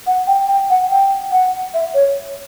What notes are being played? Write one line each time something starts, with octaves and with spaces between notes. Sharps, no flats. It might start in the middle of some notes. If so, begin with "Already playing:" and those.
F#5
G5
G5
F#5
G5
F#5
E5
C#5